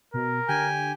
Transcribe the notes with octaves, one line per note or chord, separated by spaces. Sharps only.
B2 A#4
D3 G4 G#5